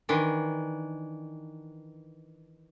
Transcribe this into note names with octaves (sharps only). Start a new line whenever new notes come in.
D#3 E3 D4